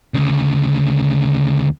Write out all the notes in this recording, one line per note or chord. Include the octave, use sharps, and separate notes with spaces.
D2 C#3